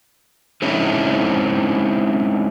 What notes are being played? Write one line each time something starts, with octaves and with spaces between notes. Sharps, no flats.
G#3 C4 C#4 D#4 E4